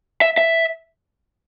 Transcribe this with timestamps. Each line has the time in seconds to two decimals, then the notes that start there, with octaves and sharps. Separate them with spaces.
0.21 E5
0.38 E5